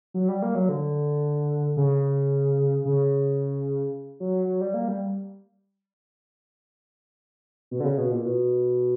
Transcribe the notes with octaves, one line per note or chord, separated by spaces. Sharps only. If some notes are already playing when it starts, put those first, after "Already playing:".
F#3
G3
A#3
F#3
D3
C#3
C#3
F#3
F#3
G3
A#3
G3
B2
D3
C#3
B2
A#2
B2